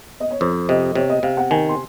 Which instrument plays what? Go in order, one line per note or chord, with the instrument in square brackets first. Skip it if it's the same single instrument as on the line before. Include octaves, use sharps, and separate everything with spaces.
[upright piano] D#5
C#5
[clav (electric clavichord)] F2 [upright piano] C5
[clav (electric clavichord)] C3 [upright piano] D#5
[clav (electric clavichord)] C3 [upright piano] C#5
[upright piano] D#5
[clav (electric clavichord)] C3 [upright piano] F5
[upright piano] F#5
[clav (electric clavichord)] D#3 [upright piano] G#5
[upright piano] C6